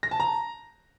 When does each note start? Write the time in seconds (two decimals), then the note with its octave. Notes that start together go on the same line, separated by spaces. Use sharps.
0.03 A#6
0.11 A5
0.20 A#5